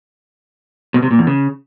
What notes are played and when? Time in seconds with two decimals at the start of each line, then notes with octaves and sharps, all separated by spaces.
0.94 B2
1.02 C3
1.11 A#2
1.19 E2
1.27 C#3